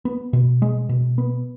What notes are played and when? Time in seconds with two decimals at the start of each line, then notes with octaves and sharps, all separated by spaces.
0.05 B3
0.33 B2
0.62 G#3
0.89 B2
1.18 B3